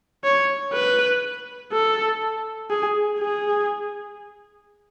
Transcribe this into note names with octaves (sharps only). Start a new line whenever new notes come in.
C#5
B4
A4
G#4
G#4